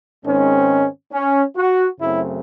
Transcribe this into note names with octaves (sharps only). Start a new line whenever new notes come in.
G#2 D#3 G#3 C4 C#4
C#4
F#4
F#2 C#3 F#3 A3 C4 E4